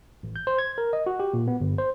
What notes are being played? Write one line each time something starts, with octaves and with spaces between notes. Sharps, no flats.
A1
G6
C5
G#6
A#4
D#5
F#4
G4
A#2
B3
G1
C5